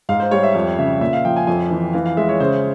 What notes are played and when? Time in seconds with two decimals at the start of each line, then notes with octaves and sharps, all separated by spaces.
0.09 G#2 F5
0.20 C5
0.31 G3 C#5
0.43 E5
0.55 F2 E5
0.79 C#3 E5
1.01 A#2 E5
1.13 F5
1.25 F3 G5
1.36 G#5
1.47 F2 G#5
1.70 E3
1.93 E3 F5
2.05 F5
2.17 G#3 E5
2.29 C#5
2.40 C#3 C5